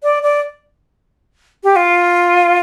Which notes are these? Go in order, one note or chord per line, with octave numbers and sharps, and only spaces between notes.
D5
D5
G4
F4